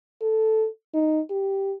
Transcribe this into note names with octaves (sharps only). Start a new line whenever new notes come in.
A4
D#4
G4